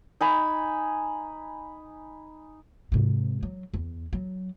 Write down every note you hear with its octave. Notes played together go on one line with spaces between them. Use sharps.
D#4 G#5 B5
G#2 C3
F#3
E2
F#3